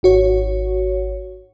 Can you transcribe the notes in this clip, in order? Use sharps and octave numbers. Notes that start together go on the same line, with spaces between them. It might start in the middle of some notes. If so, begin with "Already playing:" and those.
G#1 F#4 C#5